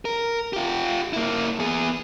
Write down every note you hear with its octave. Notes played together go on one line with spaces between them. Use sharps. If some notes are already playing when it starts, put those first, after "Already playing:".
A#4
F4 G4
A#3 E4
B3 G#4